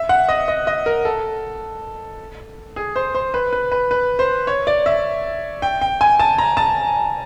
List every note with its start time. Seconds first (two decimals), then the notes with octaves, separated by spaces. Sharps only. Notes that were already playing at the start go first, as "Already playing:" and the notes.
Already playing: E5
0.09 F#5
0.29 D#5
0.48 D#5
0.67 D#5
0.86 A#4
1.05 A4
2.76 G#4
2.96 C5
3.15 C5
3.34 B4
3.53 B4
3.72 B4
3.91 B4
4.19 C5
4.47 C#5
4.67 D5
4.86 E5
5.62 G5
5.81 G5
6.01 G#5
6.19 A5
6.38 A#5
6.57 A5